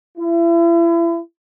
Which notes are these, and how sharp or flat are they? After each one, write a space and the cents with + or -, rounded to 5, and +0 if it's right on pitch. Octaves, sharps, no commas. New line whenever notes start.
E4 +35